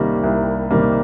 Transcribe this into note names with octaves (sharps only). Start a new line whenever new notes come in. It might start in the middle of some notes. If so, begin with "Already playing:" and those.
Already playing: C2 C3 D#3 G3 A#3
C2
C3 D#3 G3 A#3